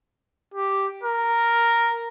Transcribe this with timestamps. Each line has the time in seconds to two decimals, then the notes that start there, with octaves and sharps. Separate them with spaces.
0.54 G4
1.03 A#4